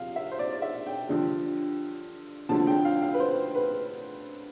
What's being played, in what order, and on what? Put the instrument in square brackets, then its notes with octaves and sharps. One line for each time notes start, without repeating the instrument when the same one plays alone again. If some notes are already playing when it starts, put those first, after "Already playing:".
Already playing: [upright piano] F2 C3 F3 F5
E5
C5
D5
D5
E5
G5
G2 D3 F3
D2 D3 F3 A5
G5
F5
F5
B4
C5
B4